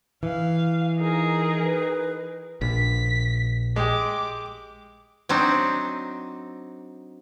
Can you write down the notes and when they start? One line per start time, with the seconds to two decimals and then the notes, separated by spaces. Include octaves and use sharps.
0.23 E3 F5
0.98 D#4 G#4 A#4
1.64 B4
2.61 A#1 B6
3.76 G#3 G4 D6
5.29 F#3 C4 D4 D#4